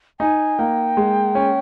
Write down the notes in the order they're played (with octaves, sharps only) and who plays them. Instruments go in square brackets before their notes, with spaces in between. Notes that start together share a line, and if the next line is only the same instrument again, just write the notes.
[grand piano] D#4 [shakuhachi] G#5
[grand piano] A#3 [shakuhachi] G5
[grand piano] G#3
C#4